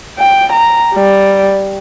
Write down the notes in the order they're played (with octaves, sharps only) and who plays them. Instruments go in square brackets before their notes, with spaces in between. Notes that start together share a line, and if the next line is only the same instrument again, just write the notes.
[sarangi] G5
A#5
G3